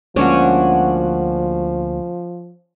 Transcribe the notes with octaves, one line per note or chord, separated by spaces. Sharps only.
D2 F3 G#3 A#3 C#4 D4 F#4 C#5